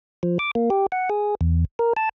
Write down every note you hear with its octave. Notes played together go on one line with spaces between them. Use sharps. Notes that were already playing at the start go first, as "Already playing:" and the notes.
F3
D6
A#3
G4
F#5
G#4
E2
A#4
A5